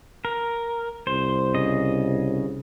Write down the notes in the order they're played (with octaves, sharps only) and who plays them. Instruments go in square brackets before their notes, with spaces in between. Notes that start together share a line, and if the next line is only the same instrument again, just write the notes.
[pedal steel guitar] A#4
[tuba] C2 [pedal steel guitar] C5
[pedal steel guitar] C#3 D#5